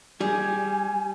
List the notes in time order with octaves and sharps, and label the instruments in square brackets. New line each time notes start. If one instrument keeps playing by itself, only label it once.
[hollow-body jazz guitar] G3 G#4 [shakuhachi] G#5